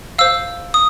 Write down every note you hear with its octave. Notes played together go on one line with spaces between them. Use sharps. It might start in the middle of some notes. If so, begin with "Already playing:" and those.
C5 F5 E6
D#6